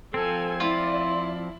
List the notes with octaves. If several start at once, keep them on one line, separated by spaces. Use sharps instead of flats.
F3 C4 A4 G#5
E4 F4 D5